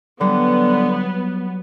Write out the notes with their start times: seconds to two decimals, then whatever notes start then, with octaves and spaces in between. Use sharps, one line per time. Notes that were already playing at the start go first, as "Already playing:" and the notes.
0.21 D3 F#3 G3 B3